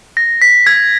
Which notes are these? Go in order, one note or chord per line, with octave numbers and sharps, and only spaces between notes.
A#6
B6
G#6